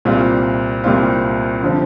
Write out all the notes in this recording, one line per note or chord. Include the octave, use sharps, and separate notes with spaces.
C2 A#2 G3 C4 F4
C2 A#2 G3 C4 F4
D3 F3 C4